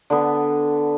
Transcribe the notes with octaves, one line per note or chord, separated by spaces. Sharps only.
D3 B3